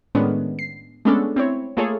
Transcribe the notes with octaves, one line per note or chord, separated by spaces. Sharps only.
A2 D#3 G#3 B3 C#4 D4
C7
G#3 A3 B3 C#4 D4 A4
C4 E4 C#5
A3 A#3 F4 G#4 A4 C#5